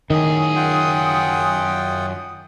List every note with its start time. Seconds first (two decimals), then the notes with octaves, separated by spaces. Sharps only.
0.10 F#2 A2 D#3 G#4 D#6
0.56 F4 F#5 G5